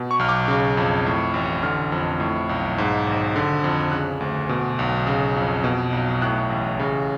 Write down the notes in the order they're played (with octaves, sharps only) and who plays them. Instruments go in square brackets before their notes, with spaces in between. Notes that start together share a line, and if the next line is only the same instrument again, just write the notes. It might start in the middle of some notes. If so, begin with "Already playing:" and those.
Already playing: [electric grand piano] B2
C#6
B1 F6
D6
C#3
F2
A2
A1
D3 F6
F2
A2
B1
G#2
G#1
D3
F2
C#3 F#6
D2
B2
B1
C#3
F2
B2
B1
A2 F#6
A1
C#3